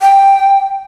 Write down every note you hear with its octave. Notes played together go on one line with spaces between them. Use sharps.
G5